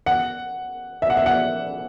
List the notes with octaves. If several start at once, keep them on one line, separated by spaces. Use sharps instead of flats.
F#5
E5
F#5
E5
F#5